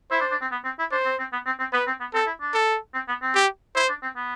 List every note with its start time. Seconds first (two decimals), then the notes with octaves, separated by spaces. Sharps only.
0.11 E4 C5
0.21 D4
0.31 D4
0.41 C4
0.52 B3
0.65 C4
0.79 E4
0.91 D4 C5
1.05 C4
1.19 C4
1.33 B3
1.46 C4
1.59 C4
1.73 B3 B4
1.87 C4
2.00 B3
2.14 C4 A4
2.26 E4
2.41 D4
2.54 A4
2.94 C4
3.08 B3
3.22 C4
3.35 G4
3.75 E4 C5
3.89 D4
4.02 C4
4.16 B3